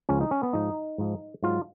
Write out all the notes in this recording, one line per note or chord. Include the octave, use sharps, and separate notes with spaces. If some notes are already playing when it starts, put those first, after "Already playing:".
C#2 C#3 F3 C#4
D#4
C#4
B3
G#2 F3 D#4
G#2 F3
G#2 F#3 F4